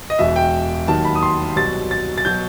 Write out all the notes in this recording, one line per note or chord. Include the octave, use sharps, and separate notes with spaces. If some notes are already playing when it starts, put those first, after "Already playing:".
D#5
E1 E2 B2 E5
G5
D#2 D#3 F#3 A5
B5
D#6
C6
C2 B2 F#3 A6
A6
A6
B2 F#3 G6